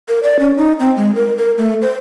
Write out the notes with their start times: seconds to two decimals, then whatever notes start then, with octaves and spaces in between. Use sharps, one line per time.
0.08 A#4
0.23 D5
0.39 C#4
0.57 D#4
0.80 C4
0.97 G#3
1.15 A#4
1.37 A#4
1.58 A3
1.82 C5